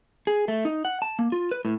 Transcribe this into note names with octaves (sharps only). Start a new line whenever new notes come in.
G#4
A3
D#4
F#5
A5
A#3
F4
B4
A2